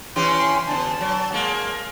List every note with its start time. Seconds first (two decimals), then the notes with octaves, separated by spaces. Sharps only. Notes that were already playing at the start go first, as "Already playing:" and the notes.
0.16 E3 C#4 G4 C6
0.67 B2 D3 A5
1.01 F#3
1.32 G#3 A#3